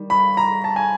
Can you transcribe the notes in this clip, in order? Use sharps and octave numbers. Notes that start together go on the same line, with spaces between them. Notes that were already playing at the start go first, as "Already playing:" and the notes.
Already playing: D#3 G3
B5
A#5
A5
G#5